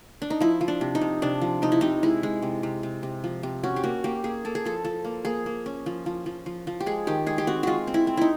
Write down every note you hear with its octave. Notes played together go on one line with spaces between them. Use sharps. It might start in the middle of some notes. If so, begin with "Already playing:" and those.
D4
D#4
F3 E4
F3
D4
C3
D#4
C3
C3 D4
F3
C3 D#4
E4
C3 D#4
G#3 E4
G#3
C3
C3
C3
C3
F3
C3
C#4 F#4
G4
A#3 F#4
A#3 G4
A#3 G#4
A#3 A4
G#4
F3 A4
F3 A4
A#3
A#3 G#4
A#3
C#4
F3
F3
F3
F3
F3
G4
G#3 G#4
D#3 G4
G#3 G#4
G4
C4 F#4
G#3 F4 F#4
C4
E4
C4
D#4 E4